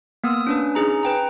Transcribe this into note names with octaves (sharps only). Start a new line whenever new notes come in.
A#3 B3 D#6 E6
C#4 D4 B4
C#4 D#4 G#4 A#5
B4 G5 A#5